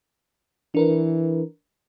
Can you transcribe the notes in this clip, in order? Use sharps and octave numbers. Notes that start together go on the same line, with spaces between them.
E3 D4 A#4 B4